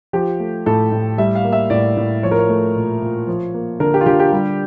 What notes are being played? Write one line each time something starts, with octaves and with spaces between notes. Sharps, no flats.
F3 G4
A3
A2 A4
A2
G3 E5
F5
A#3
E5
A2 D5
A2
F3 C#5
A#4
C#5
A3
A#2
A#2
F3
A#3
D3 A#4
G4
F4
D3 G4
G4
G3